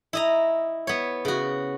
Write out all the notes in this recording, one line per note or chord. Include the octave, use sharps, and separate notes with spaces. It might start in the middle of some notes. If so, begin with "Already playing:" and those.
E4 D#5 A#5
B3 C#5
C#3 F#4